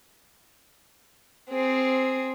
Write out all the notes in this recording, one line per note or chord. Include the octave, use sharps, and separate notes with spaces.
C4 G#4